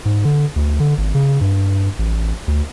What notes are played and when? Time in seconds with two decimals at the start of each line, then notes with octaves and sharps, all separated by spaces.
0.05 G#2
0.25 D3
0.56 D2
0.80 D3
0.98 G#1
1.15 C#3
1.41 G2
1.99 A1
2.48 D2